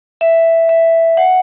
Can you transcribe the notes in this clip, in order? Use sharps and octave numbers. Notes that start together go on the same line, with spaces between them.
E5
E5
F#5